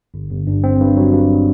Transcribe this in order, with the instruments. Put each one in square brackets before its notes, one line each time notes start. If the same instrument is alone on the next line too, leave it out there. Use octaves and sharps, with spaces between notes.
[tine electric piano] G1
G1
G2
C4
G2
F#3
G2